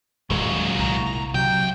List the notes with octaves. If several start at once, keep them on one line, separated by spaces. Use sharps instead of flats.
D#1 A#2 F#3 G#3
C2 A#5
C#2 C3 F#3 G5 G6